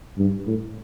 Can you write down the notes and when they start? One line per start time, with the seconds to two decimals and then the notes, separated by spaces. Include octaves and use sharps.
0.18 G2
0.46 A2